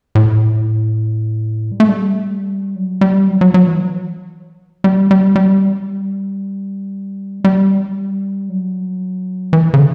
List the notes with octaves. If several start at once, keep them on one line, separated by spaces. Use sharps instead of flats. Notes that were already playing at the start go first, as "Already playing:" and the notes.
A2
G3
A3
G3
F#3
G3
F#3
F#3
F#3
E3
G3
G3
G3
G3
F#3
E3
C#3
D3